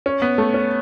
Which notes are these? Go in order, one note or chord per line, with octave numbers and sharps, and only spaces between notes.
C#4
B3
A3
C#4